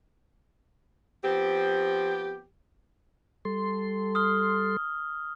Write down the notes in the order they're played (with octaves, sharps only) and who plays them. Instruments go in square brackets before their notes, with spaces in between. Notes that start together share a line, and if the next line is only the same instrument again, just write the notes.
[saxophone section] F3 B3 C4 G4
[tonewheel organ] G3 A4 C6
[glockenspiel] D#6 F6 G7